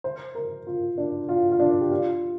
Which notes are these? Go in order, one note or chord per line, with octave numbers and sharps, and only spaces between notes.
C5
A#4
F4
D4
F4
F4
D4
G4
F4